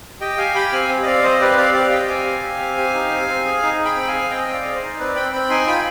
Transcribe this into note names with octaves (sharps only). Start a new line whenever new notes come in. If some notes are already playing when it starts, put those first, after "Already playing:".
G4 D#5 G5
G4 F5 G#5
G4 G5 B5
C4 F5 G#5
C4
D#5
C4 D5 F5
C4 C5 D#5
G4 B4 D5
C4 D5 F5
G4 D5 F5
G4 D#5 G5
C4 F5 G#5
G4
G4
C4
G4
D#4
C4
C4
G#4
D#4
G#4
G5 B5
C4
F5 G#5
G#4
C4 D#5 G5
C4 D5 F5
G#4
C5 D#5
D#4
C4 B4 D5
C4 G5 B5
C4 G5 B5
D#4 G#5 C6
F4 G5 B5